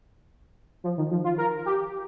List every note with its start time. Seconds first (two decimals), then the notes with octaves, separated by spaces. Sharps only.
0.84 F3
0.97 D#3
1.11 F3
1.24 F4
1.38 A#4
1.66 G4